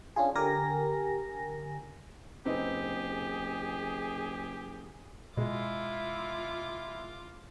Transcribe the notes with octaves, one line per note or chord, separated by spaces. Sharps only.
C#4 D4 F4 G#4
D3 G4 A#4 G#5 A#6
F#1 C4 D#4 G4 G#4 B4
B2 G#3 E4 F4 D6